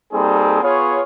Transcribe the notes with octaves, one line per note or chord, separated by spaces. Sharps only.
G3 A#3 C4 D#4 G#4 A4
B3 F4 G#4 B4 C#5